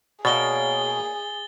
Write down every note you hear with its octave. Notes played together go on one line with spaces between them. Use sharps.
B2 A#3 G#4 C#5 D5 A6 G7